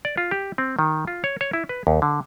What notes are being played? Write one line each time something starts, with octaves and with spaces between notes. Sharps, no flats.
D5
F4
G4
C4
D#3
F4
C#5
C#5
E4
B4
D#2
D3